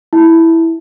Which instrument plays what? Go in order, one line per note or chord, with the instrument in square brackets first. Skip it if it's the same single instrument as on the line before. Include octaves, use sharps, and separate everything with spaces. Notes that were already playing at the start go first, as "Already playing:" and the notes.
[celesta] E4